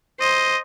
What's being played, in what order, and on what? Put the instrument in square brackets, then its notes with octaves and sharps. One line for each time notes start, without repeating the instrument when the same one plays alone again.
[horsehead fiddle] C5 [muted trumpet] D#5